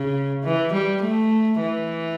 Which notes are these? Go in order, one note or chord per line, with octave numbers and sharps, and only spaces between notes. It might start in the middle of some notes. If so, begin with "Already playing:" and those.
Already playing: C#3
E3
G3
A3
E3